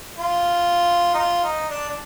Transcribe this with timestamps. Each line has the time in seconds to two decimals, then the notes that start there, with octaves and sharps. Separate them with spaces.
0.19 F4
1.14 D#4
1.19 F4
1.44 D#4
1.69 D4
1.89 D4